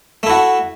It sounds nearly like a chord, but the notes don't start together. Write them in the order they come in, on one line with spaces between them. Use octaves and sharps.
A3 E4 F#4